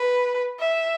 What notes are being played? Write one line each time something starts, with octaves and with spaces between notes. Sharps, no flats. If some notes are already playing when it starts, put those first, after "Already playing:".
Already playing: B4
E5